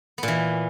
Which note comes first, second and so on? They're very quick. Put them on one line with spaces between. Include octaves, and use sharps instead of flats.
B3 A#2 E3